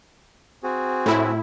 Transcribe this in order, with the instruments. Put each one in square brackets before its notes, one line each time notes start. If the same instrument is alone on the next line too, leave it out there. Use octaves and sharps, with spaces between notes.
[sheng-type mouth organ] C4 F#4 G#4
[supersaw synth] A2 E4